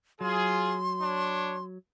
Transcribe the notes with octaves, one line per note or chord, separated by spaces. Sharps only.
F#3 F4 G#4 C6
D4 C#5